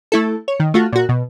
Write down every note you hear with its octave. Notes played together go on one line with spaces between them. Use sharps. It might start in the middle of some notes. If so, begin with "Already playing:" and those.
A3 E4 A4
C#5
D#3
A3 F4 F#4
A#2 F#4
B2